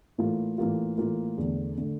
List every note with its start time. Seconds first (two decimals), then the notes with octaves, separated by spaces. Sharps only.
0.18 A2 E3 A#3 F4
0.58 A2 E3 A#3 F4
0.98 A2 E3 A#3 F4
1.37 E2 D3 A3
1.78 D3 A3